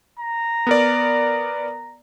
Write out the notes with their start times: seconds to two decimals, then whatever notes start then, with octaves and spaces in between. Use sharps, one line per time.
0.19 A#5
0.67 B3 A#4 D5